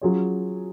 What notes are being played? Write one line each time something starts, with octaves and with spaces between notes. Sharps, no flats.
F#3 C#4 F4 G#4 C#5